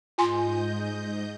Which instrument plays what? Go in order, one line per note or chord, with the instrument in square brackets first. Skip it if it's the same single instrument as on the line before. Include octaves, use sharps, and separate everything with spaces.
[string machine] G#2 D#5 G6 [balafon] F4 G#5 C6